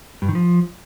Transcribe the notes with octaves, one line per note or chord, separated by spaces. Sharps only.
G2
D#3
F3